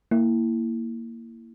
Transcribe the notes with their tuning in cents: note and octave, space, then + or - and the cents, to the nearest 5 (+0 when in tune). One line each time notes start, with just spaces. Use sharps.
A#3 -15 E4 +0